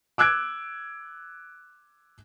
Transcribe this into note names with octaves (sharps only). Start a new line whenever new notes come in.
D6 E6 F#6 G#6 D7